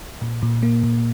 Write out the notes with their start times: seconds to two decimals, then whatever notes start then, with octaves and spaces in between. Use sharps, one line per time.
0.22 A#2
0.43 A#2
0.63 A#3
0.83 A#2